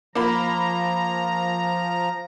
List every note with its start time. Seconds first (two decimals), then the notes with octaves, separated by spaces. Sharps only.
0.15 F3 A#3 F4 A#5 B5